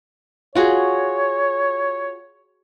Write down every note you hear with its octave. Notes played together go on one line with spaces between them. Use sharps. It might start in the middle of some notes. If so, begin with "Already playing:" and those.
F4 F#4 G#4 C#5